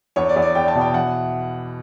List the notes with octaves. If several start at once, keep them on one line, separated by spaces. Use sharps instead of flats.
E2 C#5
D5
E2
D5
E2 G5
A5
B2
G5
E3 F#5